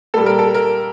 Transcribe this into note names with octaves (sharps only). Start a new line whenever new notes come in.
A#2 G3 A#3 A4
A#4
A4
A#4